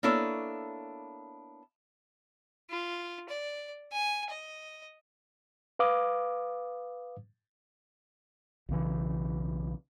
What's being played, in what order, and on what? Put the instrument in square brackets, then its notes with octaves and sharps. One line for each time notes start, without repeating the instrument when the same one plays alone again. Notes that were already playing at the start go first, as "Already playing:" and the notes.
[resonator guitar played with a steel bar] A#3 B3 D4 E4 A4 C#5
[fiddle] F4
D5
G#5
D#5
[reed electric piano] B4 F5 D6 D#6
[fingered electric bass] B1 C#3 E3